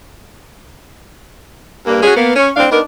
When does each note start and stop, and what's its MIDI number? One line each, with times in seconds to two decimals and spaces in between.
1.86 2.01 43
1.86 2.01 58
2.03 2.15 61
2.03 2.15 66
2.03 2.15 68
2.16 2.34 58
2.16 2.34 59
2.36 2.50 61
2.56 2.68 45
2.56 2.68 60
2.56 2.68 62
2.56 2.68 77
2.72 2.81 59
2.72 2.81 62
2.72 2.81 63
2.72 2.81 70